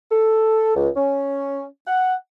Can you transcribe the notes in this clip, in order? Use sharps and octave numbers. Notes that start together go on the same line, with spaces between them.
A4
C#2
C#4
F#5